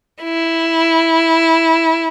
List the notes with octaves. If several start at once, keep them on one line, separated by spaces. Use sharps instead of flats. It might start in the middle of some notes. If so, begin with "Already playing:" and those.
E4